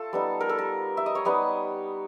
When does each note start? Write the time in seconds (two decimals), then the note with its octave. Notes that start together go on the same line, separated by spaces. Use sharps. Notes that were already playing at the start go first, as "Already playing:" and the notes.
Already playing: A3 F4 A4
0.13 G3 B3 D#4
0.41 A#4
0.49 A4
0.59 A#4
0.97 E5
1.06 D#5
1.15 C#5
1.25 G3 B3 D#4 D#5